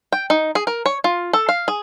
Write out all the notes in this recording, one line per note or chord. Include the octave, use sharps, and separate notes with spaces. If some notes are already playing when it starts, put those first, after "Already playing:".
G5
D#4
G#4
A#4
C#5
F4
A4
F5
G#4